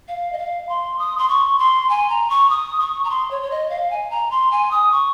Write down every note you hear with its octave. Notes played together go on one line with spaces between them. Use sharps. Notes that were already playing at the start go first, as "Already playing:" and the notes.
F5
D#5
F5
C6
D#6
C6
C#6
C6
G#5
A#5
C#6
D#6
C#6
A#5
C6
C#5
C#5
D#5
F5
G#5
A#5
C6
G#5
D#6
C#6